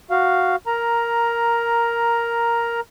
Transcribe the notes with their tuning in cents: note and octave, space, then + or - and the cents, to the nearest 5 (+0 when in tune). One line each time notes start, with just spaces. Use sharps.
F#4 +0 F5 +0
A#4 +0 A#5 +5